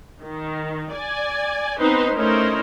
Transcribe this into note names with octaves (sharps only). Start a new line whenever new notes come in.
D#3
D5 G#5
B3 C4 D#4 B4 C5
A3 C#4 D#4 E4 A#4 C5